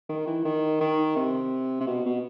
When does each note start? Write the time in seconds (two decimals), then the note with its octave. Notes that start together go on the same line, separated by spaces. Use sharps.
0.09 D#3
0.27 E3
0.45 D#3
0.81 D#3
1.16 C3
1.80 C3
1.87 B2
2.05 B2